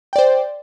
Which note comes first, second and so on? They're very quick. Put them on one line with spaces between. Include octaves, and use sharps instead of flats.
G5 D5 C5